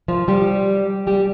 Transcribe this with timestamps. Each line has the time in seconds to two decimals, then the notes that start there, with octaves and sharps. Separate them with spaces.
0.08 F3 F4
0.28 G3 G4
1.07 G3 G4